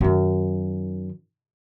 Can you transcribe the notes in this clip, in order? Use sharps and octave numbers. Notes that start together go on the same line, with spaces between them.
F#2 D#3